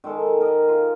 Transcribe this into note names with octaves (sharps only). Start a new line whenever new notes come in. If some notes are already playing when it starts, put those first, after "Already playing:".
D#3 G#3 A4
A4
A#4 D#5
F4